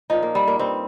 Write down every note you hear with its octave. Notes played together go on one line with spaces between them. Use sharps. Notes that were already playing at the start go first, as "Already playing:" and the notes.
A#2 F3 D#4
A#3
G3
A#3
G2 G3 C4